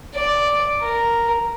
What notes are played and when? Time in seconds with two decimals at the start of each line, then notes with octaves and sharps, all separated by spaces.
0.15 D5
0.82 A#4